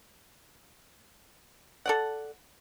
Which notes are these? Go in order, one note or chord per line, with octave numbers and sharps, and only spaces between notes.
A4 D5 F#5